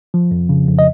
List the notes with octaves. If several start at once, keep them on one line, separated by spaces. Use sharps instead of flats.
F3
F2
C#3
F2
D#5